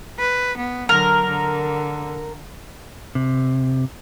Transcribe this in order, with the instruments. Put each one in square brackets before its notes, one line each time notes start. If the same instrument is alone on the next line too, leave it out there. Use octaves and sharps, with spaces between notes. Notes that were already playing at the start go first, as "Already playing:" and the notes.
[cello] B4
B3
[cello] D3 F#3 [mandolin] A#4
[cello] D3
[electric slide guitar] C3